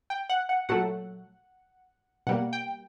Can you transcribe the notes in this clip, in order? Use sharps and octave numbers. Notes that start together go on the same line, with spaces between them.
G5
F#5
F#5
A#2 F#3 A3 F#5
B2 G3 A#3 F#5
G5